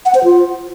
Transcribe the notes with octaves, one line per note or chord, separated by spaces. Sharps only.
F#5
C5
F4